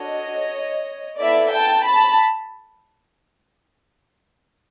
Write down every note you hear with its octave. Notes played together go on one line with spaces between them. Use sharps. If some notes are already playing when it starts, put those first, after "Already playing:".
Already playing: D4 F#4 A4 C#5 D#5
B3 E4 A4 D5 E5
G5 A5
A5 B5